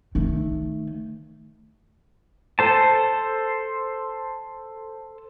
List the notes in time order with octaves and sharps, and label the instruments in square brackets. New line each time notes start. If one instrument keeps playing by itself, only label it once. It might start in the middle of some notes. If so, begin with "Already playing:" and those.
[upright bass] D#3 A3
[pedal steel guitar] A4 C5 A5